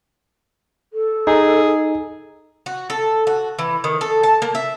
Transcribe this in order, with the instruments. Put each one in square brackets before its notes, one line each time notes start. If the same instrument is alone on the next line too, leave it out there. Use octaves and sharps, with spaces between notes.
[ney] A4
[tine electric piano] D#4 [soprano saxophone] G#4
[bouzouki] F#4
A4
F#4
E3
D#3
A4
A5
A#3
E5